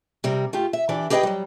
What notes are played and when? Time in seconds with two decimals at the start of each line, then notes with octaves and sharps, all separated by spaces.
0.24 C3 G3 A#4
0.53 A3 F4 G4
0.73 E5
0.89 E3 D4 G4 D5
1.10 G4 G#4 B4 D#5 F5 G5
1.23 F#3 G3